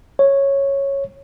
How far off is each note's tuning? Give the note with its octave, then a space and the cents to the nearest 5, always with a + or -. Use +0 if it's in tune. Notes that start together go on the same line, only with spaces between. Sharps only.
C#5 -5